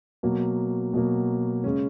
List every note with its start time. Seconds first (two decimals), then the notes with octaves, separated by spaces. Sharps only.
0.23 B2 F#3 A#3
0.94 B2 F#3 A#3
1.64 C#3 G#3 C#4